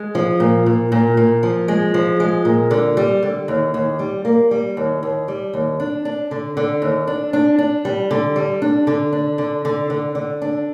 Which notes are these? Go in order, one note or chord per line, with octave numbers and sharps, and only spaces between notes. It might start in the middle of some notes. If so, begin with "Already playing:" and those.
Already playing: G#3
F3
A#2
A#2
A#2
A#2
F3
G#3
F3
G#3
A#2
D3
G3
D3
D#2
D#2
G3
A#3
G3
D#2
D#2
G3
D#2
D4
D4
D3
D3
D#2
D4
D4
D4
G3
D3
G3
D4
D3
D4
D3
D3
D3
D3
D4